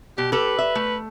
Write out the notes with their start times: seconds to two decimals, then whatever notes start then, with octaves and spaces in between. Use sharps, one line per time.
0.18 B2 G4
0.32 G4 A4 B4
0.59 E5
0.75 A3